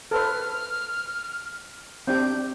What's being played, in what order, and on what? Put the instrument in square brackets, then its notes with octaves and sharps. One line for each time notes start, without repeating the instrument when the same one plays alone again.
[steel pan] A4 B4 C5 [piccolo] F6
[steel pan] C4 D4 G4 [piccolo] G6